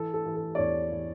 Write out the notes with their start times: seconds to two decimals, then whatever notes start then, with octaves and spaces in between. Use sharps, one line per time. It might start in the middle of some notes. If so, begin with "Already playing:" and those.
Already playing: E3 A4
0.14 A4
0.26 E3
0.36 A4
0.55 D5
0.58 E2 C#5
0.92 E3